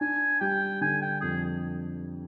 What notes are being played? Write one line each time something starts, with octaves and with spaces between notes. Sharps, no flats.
D4 G#5
G3 G5
D3 G#5
G5
F2 G#4